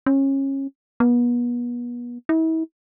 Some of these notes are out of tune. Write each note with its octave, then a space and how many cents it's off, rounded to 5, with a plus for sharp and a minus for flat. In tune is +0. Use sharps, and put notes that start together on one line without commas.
C#4 -25
B3 -35
E4 -40